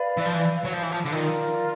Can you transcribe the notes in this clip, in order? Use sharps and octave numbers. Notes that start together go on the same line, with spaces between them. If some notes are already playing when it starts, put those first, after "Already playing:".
Already playing: B4 D5 F5
E3
F3
E3
F#3
F3
E3
F3
D3
D#3 F4 A#4 D5